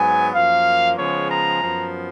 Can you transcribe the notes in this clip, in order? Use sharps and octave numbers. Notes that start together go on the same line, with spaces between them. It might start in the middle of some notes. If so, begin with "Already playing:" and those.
Already playing: G#2 F#3 B3 G#5
F#2 F3 A#3 F5
C#3 F3 G#3 B3 C#5
A#5
F#2 F3 B3